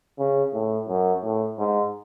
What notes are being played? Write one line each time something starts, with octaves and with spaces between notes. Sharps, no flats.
C#3
A2
F#2
A2
G#2